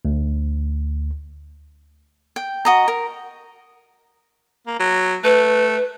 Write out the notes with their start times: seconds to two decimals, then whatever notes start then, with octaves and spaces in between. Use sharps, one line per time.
0.05 D2
2.36 G5
2.65 F#4 D#5 A#5
2.88 A#4
4.67 A#3
4.79 F#3
5.24 A3 B4